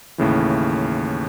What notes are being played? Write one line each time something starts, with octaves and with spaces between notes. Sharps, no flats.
D#2 A2 C#3 E3